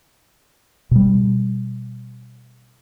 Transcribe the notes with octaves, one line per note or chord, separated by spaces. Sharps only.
B2 G3